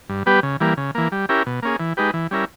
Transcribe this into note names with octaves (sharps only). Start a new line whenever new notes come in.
G2
G3 B3 G4 B4
C#3
E3 G3 A#3
C#3
E3 A#3
G3
C#4 E4 G4 A#4
B2
A#3 C#4 G#4
E3
G#3 D#4 G4 B4
E3
G3 C#4 E4 A#4